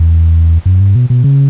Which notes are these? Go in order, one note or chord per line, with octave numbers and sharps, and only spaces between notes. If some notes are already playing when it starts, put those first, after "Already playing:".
Already playing: E2
F#2
G2
B2
B2
C#3